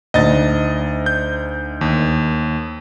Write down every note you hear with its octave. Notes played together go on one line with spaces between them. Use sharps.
D2 D3 D#4 D#5 A6
G6
D#2